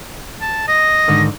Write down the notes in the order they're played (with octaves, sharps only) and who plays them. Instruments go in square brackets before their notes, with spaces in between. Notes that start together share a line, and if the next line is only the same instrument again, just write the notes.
[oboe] A5
[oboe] D#5 [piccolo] A#6
[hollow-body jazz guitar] G#2 D3 D#3